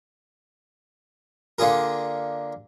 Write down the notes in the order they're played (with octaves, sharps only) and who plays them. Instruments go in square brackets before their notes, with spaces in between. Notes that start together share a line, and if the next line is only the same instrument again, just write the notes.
[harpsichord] D3 A#3 D4 F4 G#4 A#4